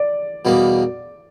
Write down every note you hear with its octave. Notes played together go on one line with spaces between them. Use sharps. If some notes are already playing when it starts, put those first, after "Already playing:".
Already playing: D5
E2 B2 G3 A#3